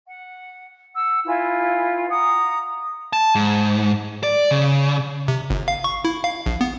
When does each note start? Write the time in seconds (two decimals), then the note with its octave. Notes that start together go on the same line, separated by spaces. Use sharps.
0.05 F#5
0.94 F#5 E6
1.25 E4 F4 B4 G#5
2.08 F#5 A#5 D#6
3.13 A5
3.35 G#2
4.23 D5
4.51 C#3
5.28 C3
5.50 G1
5.68 F5
5.84 C#6
6.05 E4
6.24 F5
6.46 A#1
6.61 B3